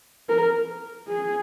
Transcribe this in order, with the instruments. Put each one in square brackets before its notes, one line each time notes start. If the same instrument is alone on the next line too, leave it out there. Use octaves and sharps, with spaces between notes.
[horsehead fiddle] A#4
G#4